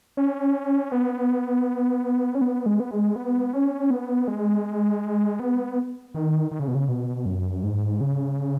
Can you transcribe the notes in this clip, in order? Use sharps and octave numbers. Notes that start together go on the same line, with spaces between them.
C#4
B3
C#4
B3
G#3
B3
G#3
B3
C#4
B3
G#3
B3
D#3
D#3
C#3
B2
C#3
B2
F#2
G#2
C#3